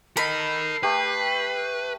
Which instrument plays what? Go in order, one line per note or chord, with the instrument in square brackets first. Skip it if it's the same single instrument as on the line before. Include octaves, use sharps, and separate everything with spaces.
[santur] A4 [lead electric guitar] A#4 D#5 [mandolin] B5 [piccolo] C7
[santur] A3 G4 [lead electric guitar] B4